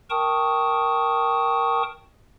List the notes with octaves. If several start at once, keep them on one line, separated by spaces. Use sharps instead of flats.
A#4 G5 A5 C#6 D#6